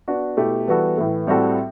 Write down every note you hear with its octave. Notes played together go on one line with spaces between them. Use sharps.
B3 D4 F#4
B2 A3 E4 G4
E3 G3 B3 F#4 A4
A2 E3 A3
A2 G3 C4 F#4 A4